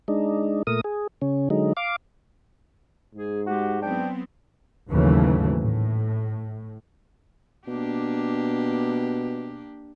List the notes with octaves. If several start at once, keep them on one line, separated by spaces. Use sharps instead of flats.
G#3 D4 D#4
A#2 A3 A#4 D#6
G#4
C#3 C#4
D3 F#3 G#3 D#4
F5 D6
G#2 G#4
G#3 F#4 G4
F#3 B3 C4 D4 G5
G#1 D#2 C#3 E3 F#3 A3
A2
B2 A#3 D4 G4